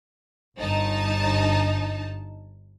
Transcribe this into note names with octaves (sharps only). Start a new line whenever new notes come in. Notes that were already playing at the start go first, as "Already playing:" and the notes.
G1 G2 D#4 A5